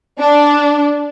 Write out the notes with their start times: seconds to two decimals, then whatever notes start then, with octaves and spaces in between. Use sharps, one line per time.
0.19 D4